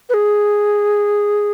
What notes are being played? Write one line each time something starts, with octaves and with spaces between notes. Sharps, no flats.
B4
G#4